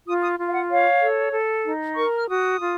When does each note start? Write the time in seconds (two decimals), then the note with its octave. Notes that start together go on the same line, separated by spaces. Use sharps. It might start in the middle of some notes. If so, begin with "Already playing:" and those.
0.07 F4 D#6
0.22 D#6
0.38 F4
0.49 F5
0.54 F#5
0.70 C#5 F5
1.02 A4
1.33 A4
1.65 D#4
1.96 A#4 C#6
2.17 F6
2.28 F#4 D#6
2.60 F4